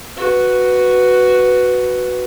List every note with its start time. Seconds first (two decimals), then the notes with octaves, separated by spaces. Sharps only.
0.17 F#4 B4